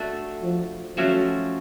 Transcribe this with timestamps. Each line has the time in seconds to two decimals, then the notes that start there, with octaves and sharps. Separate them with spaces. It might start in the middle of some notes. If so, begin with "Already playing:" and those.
Already playing: A3 D4 F#4 A4
0.43 F3
0.97 F3 F#3 A3 C#4 F#4